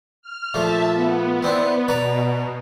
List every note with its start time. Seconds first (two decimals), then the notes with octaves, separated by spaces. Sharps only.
0.22 F6
0.54 A#2 F3 A3 E5 A5
0.95 B3
1.43 C4 D4 E4
1.88 B2 B4 D5 A#5